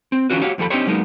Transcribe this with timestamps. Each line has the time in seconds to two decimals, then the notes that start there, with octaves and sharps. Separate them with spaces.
0.12 C4
0.30 E3 C#4 D4 F4 F#4 B4
0.42 F#4 G4 C#5 F5
0.58 D#2 F3 A3 A4 B5
0.70 C4 D4 D#4 G4 C5 C#5
0.87 F#3 G#3 A#3 B3 D#4